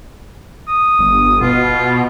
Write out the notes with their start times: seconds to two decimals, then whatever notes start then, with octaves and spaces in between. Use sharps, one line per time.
0.68 D#6
0.99 G1
1.41 B2 F4